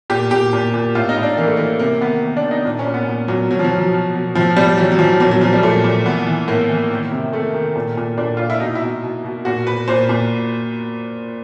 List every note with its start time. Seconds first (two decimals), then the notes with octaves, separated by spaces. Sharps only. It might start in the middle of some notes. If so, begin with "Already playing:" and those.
0.10 A#2 G4
0.31 A#2 G4
0.53 A#2
0.74 A#2
0.95 A2 F4
1.09 D#4
1.17 A2
1.23 D4
1.37 E3 A#3
1.47 A3
1.57 E3 A#3
1.79 C3 A#3
2.01 D#3 B3
2.22 D#3
2.37 D4
2.43 D#3
2.51 D#4
2.65 A#2 D4
2.79 C#4
2.87 A#2
2.94 B3
3.08 A#2
3.28 A#2 F#3
3.51 B2 F#3
3.59 F3
3.64 F#3
3.71 B2
3.78 F3
3.93 B2
4.14 B2
4.35 A2 F3
4.57 A2 G3
4.77 E3 F#3
4.92 F#3
4.99 E3 F3
5.20 A#2 F#3
5.31 F#3
5.41 A#2 F3
5.53 G3
5.63 A#2 A3
5.84 A#2
6.06 E3 B3
6.27 E3
6.48 A2 A#3
6.69 E3
6.91 D#3
7.12 C3
7.32 D#3 A3
7.54 D#3
7.76 A#2
7.97 A#2
8.17 A#2 D4
8.37 A#2 F4
8.50 E4
8.60 B2 D#4
8.75 E4
8.82 B2
9.03 B2
9.24 B2
9.45 A#2 F#4
9.67 A#2 B4
9.88 A#2 C5
10.09 A#2